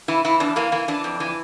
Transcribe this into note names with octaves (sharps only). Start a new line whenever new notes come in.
E3 E4
E3 E4
E2 D4
E3 A#3
E3 A#3
E3 D4
F2
E3